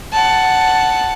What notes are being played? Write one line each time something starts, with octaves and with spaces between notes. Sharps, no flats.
F#5 A5